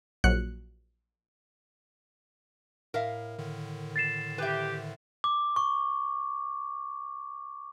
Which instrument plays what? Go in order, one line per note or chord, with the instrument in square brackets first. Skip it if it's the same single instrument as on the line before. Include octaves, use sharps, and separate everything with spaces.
[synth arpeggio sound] A#1 F#3 F#6 C#7
[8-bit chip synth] A2 [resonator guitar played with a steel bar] A#4 E5 F5
[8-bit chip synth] A2 D3 D#3
[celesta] A6 C7 E7
[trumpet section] G4 [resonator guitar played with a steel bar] B4 E5
[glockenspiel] D6
C#6